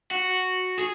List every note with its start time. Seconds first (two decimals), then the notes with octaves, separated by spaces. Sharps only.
0.11 F#4
0.78 G#4